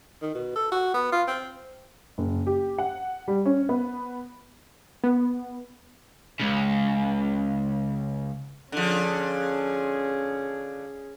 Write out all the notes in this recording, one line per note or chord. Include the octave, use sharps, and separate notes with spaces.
D#3
B2
A4
F#4
B3
F4
C4
F#1
G4
F#5
G3
C#4
B3
B3
C#2 C#3
D3 F3 C#4 G#4